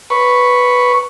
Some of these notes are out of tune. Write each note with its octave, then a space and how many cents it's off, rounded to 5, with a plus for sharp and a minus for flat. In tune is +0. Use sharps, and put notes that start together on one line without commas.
B4 +0 C#6 +0